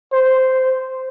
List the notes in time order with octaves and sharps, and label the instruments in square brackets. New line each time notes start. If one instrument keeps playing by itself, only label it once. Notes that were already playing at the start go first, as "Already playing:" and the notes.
[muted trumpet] C5